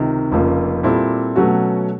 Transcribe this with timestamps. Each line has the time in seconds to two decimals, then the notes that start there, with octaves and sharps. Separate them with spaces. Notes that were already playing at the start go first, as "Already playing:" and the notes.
Already playing: C#2 C3 D#3
0.32 F1 F2 C#3 F3 A#3
0.83 A#2 G3 C4 E4 A4
1.36 B2 F#3 A3 C#4 F#4